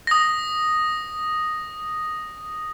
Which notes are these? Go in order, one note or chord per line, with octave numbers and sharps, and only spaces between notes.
D#6 A#6